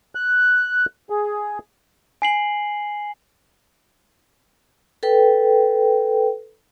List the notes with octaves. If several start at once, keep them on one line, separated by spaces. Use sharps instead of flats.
F#6
G#4
G#5 C7 F#7
A4 B4 G5